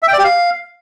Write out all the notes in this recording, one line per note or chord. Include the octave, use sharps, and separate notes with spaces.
E5
G5
D5
G4
F5